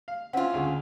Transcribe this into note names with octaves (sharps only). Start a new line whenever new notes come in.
F5
C4 C#4 E4 F4 F#5
D2 C#3